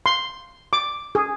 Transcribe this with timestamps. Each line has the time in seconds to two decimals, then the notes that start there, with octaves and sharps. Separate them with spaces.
0.06 C6
0.73 D6
1.15 G#4